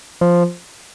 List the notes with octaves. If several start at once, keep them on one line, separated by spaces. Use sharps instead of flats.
F3